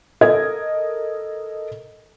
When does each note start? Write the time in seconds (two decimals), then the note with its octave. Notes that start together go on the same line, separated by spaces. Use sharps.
0.21 A4 A#4 D#5 G#6